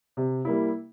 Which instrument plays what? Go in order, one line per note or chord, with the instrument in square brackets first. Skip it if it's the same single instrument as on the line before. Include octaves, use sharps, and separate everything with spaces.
[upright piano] C3
G3 A#3 E4